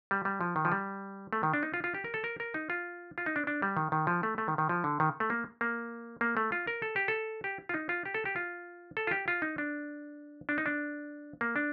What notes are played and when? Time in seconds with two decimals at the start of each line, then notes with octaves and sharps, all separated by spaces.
0.11 G3
0.25 G3
0.41 F3
0.56 D#3
0.65 F3
0.72 G3
1.33 A3
1.43 D#3
1.54 D4
1.63 D#4
1.74 F4
1.84 F4
1.94 G4
2.04 A#4
2.14 A4
2.24 A#4
2.40 A#4
2.54 D#4
2.70 F4
3.18 F4
3.26 D#4
3.36 D4
3.47 D4
3.62 G3
3.77 D#3
3.92 D#3
4.07 F3
4.23 A3
4.38 A3
4.48 D#3
4.58 D#3
4.69 F3
4.84 D3
5.00 D#3
5.20 A3
5.30 A#3
5.61 A#3
6.21 A#3
6.37 A3
6.52 F4
6.67 A#4
6.82 A4
6.96 G4
7.08 A4
7.44 G4
7.69 F4
7.74 D#4
7.89 F4
8.05 G4
8.14 A4
8.25 G4
8.36 F4
8.97 A4
9.07 F4
9.11 G4
9.28 F4
9.42 D#4
9.58 D4
10.49 D4
10.58 D#4
10.66 D4
11.41 A#3
11.56 D4